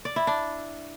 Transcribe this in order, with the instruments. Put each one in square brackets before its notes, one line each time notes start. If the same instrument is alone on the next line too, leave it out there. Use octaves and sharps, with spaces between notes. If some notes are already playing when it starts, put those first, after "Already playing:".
[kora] D5
E4
D4